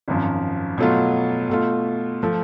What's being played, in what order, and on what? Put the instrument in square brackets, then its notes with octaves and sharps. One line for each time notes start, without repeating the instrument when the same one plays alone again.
[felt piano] G#1 F#2 F3
B2 F#3 A3 F4
B2 A3 F4
F3 A3